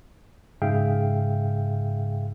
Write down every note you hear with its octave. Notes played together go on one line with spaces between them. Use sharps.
G#2 C#3 G#4 E5 F5 G5